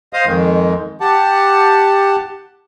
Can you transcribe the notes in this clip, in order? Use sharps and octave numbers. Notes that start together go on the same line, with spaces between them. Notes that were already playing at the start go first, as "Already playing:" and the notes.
C5 D#5 F5 D#6
F2 D#3 G#3
G4 F#5 A5